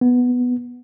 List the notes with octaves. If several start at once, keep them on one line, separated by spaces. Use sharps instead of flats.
B3